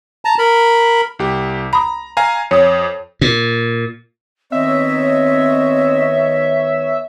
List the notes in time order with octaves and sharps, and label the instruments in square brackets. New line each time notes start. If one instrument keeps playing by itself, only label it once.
[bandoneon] A5 A#5
A#4 B5
[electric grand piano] C2 G4
[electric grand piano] A#5 [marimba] B5 D#6
[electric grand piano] F5 G#5 A#5
[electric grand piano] F2 D#6 [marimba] C#5
[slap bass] A#2
[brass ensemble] D#3 B3 C#5 [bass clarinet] C4 [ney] D#5 [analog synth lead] E5